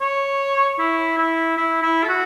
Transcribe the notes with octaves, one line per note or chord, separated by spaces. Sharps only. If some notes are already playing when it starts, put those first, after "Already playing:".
C#5
E4
E4
E4
E4
A4
F#4